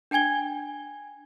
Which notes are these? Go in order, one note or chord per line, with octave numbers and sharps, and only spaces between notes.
D4 G5 G#5 G#6 G7